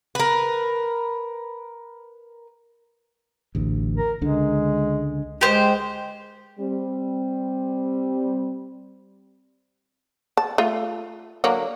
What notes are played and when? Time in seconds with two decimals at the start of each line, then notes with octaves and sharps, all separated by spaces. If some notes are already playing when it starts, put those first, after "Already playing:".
0.15 A#4 B4
3.55 A1 D2
3.96 A#4
4.22 C#2 D3 G#3
5.41 G#3 G4 C5
6.60 G3 C4
10.37 A5
10.58 A3 F4
11.44 D3 F#3 A#3